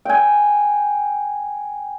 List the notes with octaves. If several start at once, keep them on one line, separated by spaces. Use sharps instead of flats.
G5 G#5